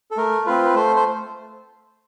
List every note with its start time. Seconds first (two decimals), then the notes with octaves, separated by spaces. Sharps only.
0.11 A4
0.17 A3 A#4
0.46 C4 F4 B4
0.65 B4
0.75 A3 C5
0.96 C5